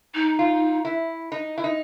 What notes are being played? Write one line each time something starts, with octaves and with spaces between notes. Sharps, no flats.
D#4
F4
E4
D#4
E4
D#4